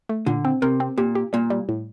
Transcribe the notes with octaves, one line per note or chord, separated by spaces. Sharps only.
A3
A#2 D3
C4
C3 A#4
C4
A#2 G4
G4
A#2 G3
G3
A2